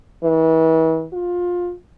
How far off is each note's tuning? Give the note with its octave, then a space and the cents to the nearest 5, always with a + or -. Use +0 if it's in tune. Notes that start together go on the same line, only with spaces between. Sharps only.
E3 -35
F4 +20